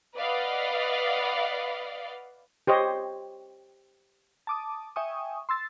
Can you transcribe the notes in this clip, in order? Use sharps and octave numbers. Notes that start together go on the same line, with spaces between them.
B4 D5 D#5 F5 F#5
G4 C5 C#5 D#5
A5 D6 D#6
E5 G5 G#5 C#6 D#6
C6 E6 A6